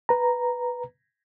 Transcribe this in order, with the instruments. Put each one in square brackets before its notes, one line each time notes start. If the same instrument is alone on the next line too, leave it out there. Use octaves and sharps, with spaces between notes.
[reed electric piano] B4 A#5